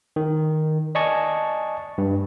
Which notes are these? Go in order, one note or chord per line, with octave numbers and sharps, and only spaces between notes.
D#3
D5 D#5 G#5 A5 C#6
G2